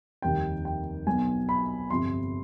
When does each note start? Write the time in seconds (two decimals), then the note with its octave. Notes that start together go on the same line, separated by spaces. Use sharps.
0.22 F1 D#2 D#3 G3 G5
0.65 G5
1.07 B1 B2 B3 G#5
1.49 B5
1.90 G1 F2 C3 F3 C6